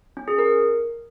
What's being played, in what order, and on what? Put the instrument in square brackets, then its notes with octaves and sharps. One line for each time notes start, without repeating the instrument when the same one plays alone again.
[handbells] C#4
G#4
A#4